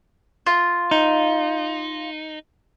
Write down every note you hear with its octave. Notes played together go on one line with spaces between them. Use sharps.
F4
D#4